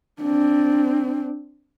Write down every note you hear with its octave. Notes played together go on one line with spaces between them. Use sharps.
C4 D4